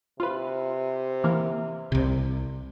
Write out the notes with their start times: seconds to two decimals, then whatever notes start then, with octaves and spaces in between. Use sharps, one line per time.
0.20 C3 F4 B4
1.24 E3 A#3 A#4
1.92 C2 C3